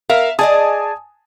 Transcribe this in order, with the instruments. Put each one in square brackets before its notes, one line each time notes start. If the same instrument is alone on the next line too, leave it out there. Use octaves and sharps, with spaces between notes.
[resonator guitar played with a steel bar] A#4 [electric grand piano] E5 F5
[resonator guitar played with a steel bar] G#4 D5 D#5 [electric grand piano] G#5 A5 D#6